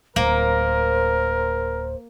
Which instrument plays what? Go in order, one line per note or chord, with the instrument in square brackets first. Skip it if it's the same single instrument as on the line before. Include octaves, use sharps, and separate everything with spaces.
[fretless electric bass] D1 [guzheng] A#3 [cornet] A#4 [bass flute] C5